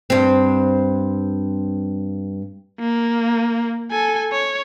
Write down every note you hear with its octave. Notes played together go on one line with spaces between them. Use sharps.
G2 C4
A#3
A4 G#5
C#5